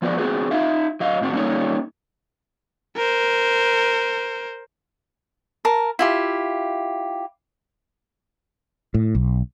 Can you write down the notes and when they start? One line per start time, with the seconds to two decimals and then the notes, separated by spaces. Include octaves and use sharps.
0.02 F3 B3 F#4 B4 D5
0.18 B3 C4 F#4 G#4 B4
0.51 D#4 E5 F5
1.00 F#3 D#5 F5
1.21 A2 C4 F#4
1.33 G3 A#3 C#4 D#4 A4 C#5
2.96 A#4 C5
5.65 A#4 A5
5.99 E4 F4 G4
8.94 A2
9.15 B1